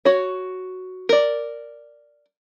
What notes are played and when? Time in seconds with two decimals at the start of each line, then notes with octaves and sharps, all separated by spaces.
0.05 F#4 C#5
1.09 A#4 D5